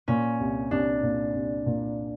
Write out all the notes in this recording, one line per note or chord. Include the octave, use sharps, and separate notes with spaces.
A#2 C#4
C2
C2 D4
A#2
C2
A#2